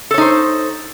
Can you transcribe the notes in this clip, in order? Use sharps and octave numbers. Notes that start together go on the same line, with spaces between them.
D#4 A4 C5 C#5